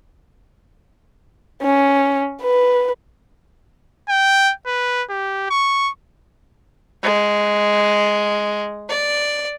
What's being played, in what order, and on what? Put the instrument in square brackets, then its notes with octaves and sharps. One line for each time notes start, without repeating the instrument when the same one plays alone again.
[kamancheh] C#4
B4
[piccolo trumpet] G5
B4
G4
C#6
[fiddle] G#3
D5